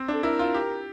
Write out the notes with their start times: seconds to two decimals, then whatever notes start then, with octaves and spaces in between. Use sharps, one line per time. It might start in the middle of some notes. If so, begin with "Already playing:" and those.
Already playing: C4
0.08 D4
0.14 A4
0.23 E4 A#4
0.39 F4
0.54 G4